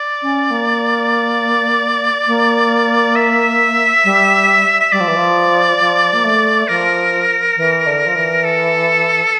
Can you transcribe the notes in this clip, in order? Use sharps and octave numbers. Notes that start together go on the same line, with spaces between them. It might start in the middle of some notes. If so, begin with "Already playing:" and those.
Already playing: D5
C#4
A#3
A#3
E5
G3
E5
G3 D5
F3
E3
F3
F3
A#3
A3
F3 A#4
E3
D3
F3
E3
A4